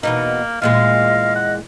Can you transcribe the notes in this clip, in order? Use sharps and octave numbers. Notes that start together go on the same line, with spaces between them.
E2 B2 A#3 D#4
E2 A#2 G#3 D#5 F5
F#5